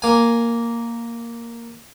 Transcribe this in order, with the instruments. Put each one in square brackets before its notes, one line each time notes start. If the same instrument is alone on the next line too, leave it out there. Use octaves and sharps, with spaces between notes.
[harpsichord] A#3 G#5